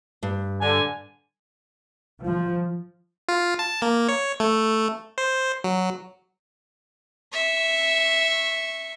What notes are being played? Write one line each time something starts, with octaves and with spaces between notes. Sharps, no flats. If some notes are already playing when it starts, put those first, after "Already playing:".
G2
D3 G#5
F3
F4
A5
A#3
C#5
A3
C5
F#3
E5 C#6